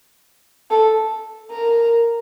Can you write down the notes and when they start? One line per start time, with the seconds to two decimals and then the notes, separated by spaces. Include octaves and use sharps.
0.71 A4
1.51 A#4